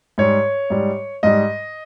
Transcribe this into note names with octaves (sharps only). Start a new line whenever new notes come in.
G#2 G3 C#5
G#2 G3
G#2 G3 D#5